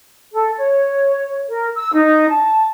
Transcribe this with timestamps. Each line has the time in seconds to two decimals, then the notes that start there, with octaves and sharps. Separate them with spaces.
0.33 A4
0.58 C#5
1.49 A#4
1.76 E6
1.94 D#4
2.29 A5